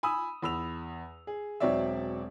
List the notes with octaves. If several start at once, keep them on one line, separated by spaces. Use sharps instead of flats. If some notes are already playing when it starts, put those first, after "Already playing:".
G#5 B5 D#6 E6
E2 B5 E6 F7
G#4
E1 F#3 C4 C#5 D5 E5